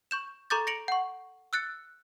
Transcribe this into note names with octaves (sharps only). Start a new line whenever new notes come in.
C#6 G6 E7
A4 A#5 C#6 D6 G6 A6
A#6 C#7 D7 F7 F#7
F#5 C#6
E6 F#6 A6 C#7